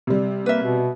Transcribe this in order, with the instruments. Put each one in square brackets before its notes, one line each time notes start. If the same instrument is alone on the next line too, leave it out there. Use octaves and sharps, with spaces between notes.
[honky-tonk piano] C3 G3
[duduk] A#3 [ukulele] B4 E5
[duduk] B2